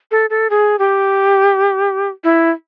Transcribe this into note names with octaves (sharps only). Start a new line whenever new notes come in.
A4
A4
G#4
G4
E4